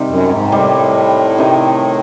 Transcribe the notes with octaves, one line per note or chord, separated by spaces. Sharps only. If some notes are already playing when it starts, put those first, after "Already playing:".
Already playing: C3 D#3 G3
F#2
G#2
A2 C3 D#3 G3
C3 D#3